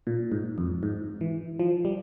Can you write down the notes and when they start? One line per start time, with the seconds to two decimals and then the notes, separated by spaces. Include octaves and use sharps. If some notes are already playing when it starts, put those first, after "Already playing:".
0.07 A#2
0.32 G#2
0.58 F2
0.83 G#2
1.21 E3
1.59 F3
1.85 G3